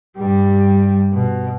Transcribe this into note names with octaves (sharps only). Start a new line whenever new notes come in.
G2 G3
B2